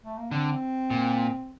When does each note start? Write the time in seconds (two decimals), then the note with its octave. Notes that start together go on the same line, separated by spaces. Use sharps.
0.05 A3
0.18 A#3
0.31 D3 C4
0.91 A#2